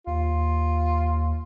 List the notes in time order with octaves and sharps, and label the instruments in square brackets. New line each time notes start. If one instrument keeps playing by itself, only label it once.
[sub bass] D#2 [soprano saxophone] F4